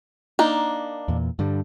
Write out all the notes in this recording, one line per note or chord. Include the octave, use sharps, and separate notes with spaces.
A#3 D4 D#4
E2 A#2
G2 D3 G3